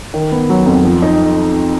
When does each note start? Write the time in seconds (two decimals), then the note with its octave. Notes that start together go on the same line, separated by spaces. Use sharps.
0.14 D#3
0.32 B3
0.49 F#3
0.66 F2
0.85 F3
1.02 D#4